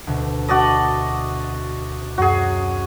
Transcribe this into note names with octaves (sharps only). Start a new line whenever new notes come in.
D2 B2
F#4 D5 D#5 A5
F#2 F#4 G#4